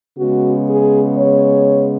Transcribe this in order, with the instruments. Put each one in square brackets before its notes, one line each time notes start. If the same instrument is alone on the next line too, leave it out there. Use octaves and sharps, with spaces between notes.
[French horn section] C#3 G#3 B3 F#4
G#4
C#5